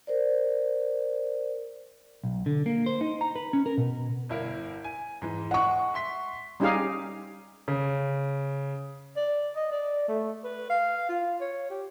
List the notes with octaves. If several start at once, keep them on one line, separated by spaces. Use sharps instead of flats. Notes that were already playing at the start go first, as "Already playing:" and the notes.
A#4 C5 D5
B1
D3
A#3
C5
D#4
A#5
B4
C#4
A#4
B2
G1 E4 A#4
G#5
G#2 E3
G#3 F#5 C#6
E5 C6 B6
G3 C#4 D#4 G4 G#4 F5
C#3
D5
D#5
D5
A3
B4
F5
F4
C#5
G4